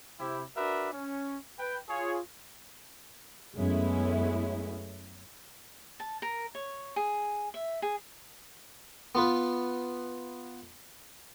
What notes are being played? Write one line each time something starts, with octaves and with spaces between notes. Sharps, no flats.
C3 E4 G4
D4 F#4 A#4 B4 D5 E5
C#4
B4 G5
F4 G#4 C#5
F#2 G#3 A3 B3 C#4 E4
A5
A#4
C#5
G#4
E5
G#4
B3 F4 B4